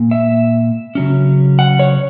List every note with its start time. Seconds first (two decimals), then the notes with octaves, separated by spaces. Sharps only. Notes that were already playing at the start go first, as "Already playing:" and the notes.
Already playing: A#2 A#3
0.11 E5
0.95 C#3 F#3 C#4
1.59 F#5
1.79 C#5